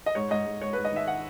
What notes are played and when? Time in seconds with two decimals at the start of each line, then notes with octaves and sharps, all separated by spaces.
0.06 D#5
0.15 G#2 C#5
0.31 G#2 D#5
0.46 G#2
0.61 G#2 C#5
0.73 G#2 B4
0.85 D#5
0.92 D#3 E5
1.08 F#5